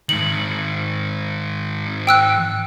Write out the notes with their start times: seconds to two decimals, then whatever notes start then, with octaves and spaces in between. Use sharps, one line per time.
0.09 G#2 D#3 F#7
2.07 G5 E6 F#6